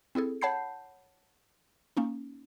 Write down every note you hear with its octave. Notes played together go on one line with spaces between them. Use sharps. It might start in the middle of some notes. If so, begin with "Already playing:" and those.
C4 E4 G#4 A4
C#5 F#5 A5 B5 G6 C7
A#3 C#4 D#4